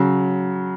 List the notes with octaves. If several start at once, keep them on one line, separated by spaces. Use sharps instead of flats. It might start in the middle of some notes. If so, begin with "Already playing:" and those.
Already playing: C#3 F#3